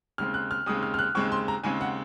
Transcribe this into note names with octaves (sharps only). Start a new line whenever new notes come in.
D#2 C#3 G#3 C4 F6
F#6
F6
D#2 C#3 G#3 C4 D#6
F6
F6
F#6
D#2 C#3 G#3 C4 C#6
C6
A#5
D#2 C#3 G#3 C4 G#5
F#5